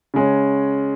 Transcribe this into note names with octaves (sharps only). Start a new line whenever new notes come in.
C#3 G#3 C#4